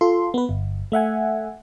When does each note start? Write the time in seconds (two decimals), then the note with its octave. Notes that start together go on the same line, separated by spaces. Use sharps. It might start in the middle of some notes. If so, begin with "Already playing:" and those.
0.01 F4 A4 C6
0.34 B3 B4
0.49 G1
0.92 A3 E5 F#5 G#5